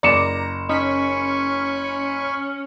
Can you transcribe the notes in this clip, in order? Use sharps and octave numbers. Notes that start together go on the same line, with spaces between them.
F#1 D5 A#5 C#7 E7
C#4 D#4 G#5 B5 C#6 B6